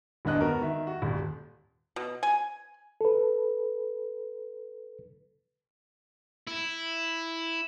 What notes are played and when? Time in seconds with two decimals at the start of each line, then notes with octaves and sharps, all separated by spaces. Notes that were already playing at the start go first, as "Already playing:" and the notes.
0.25 D#1 E2 G2 D4 D#5 F#6
0.41 B3 F#4 A#4
0.62 D#3 E5
0.87 F#4
1.02 D#1
1.96 B2
2.23 G#5
3.01 A4 B4
6.47 E4